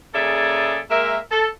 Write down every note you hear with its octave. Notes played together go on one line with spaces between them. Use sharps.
C#3 A#3 G#4 A4 D5 E5
G#3 A#3 A#4 E5
A4